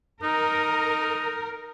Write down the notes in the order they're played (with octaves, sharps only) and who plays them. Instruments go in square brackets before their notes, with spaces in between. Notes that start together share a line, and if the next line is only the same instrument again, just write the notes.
[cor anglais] D#4 [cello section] A#4